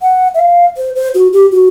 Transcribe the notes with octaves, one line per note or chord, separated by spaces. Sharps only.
F#5
E5
F5
C5
C5
F#4
G4
F#4